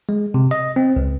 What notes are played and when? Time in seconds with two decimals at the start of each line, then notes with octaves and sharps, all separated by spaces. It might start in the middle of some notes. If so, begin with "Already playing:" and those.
0.09 G#3
0.34 C3
0.51 D#5
0.76 C4
0.96 C#2